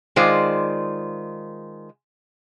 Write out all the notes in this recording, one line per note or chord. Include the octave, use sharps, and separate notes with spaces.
D#3 G#3 F4 C5 D5